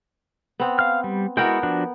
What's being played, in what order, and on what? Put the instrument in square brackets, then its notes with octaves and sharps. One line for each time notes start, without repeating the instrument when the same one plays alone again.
[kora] B3 C4
[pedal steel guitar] F5 F6
G3
[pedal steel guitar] G#3 E4 F#4 [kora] B3 A#4 G5
[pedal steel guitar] F3 D4 F#4